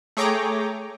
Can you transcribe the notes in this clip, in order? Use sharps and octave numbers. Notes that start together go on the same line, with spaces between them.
A3 G#4 C#5 G5 A#5 D6